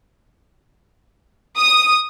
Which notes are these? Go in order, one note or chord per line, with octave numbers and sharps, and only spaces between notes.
D#6